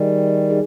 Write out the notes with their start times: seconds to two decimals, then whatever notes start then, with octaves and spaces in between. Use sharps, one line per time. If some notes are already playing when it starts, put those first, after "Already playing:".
Already playing: D#3 G3 G#4 D#5 G#5
0.49 D#4 G#4